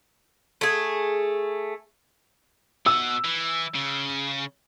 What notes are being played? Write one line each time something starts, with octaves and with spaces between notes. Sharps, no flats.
A3 G#4
B2 F#5 E6
E3
C#3